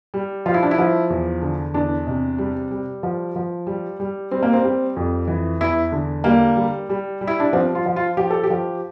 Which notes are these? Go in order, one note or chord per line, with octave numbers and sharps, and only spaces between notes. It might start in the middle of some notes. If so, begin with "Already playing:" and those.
G3
F3 F4
E4
D4
E4
F3
E2
D3
E2 D4
C3
G3
G3
F3
F3
G3
G3
G3 C4
A#3
C4
G3
F2
E3
E2 E4
D3
G3 A#3
G3
G3
G3
E4
D4
F3 C4
F4
F3
F4
F3 G4
A4
G4
F3